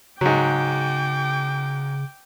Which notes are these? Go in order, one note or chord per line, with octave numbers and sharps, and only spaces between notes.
G#2 C#3 F#3 G5 D6